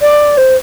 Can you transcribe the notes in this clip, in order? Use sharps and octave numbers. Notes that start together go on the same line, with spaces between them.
D5
C5